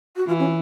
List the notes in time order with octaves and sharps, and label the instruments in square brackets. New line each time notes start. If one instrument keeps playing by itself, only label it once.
[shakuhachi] F#4
[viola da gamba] E3 [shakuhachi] F4
[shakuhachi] C#4